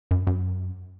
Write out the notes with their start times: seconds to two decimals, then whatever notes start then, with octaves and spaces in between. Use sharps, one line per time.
0.11 F#2
0.27 F#2